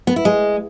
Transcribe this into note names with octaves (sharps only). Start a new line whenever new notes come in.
B3
E4
G#3